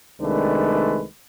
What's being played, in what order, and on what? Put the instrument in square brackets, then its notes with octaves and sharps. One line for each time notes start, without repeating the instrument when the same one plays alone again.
[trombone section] C2 D#3 G#3 A3 D4 B4